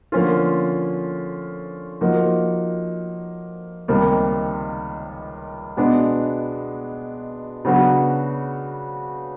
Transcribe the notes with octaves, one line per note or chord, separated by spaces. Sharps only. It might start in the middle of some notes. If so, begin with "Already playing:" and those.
D3 F3 A#3 C#4 F4
F3 A#3 D#4 F#4
C#2 C3 D#3 G3 A#3
B2 G#3 B3 D4
C#3 F#3 B3 D4 F#4